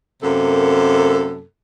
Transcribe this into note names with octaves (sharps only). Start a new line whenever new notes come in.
F#2 C3 A#3 A4